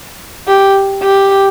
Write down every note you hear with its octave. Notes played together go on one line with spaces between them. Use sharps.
G4
G4